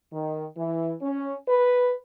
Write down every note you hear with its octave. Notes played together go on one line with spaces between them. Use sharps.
D#3
E3
C#4
B4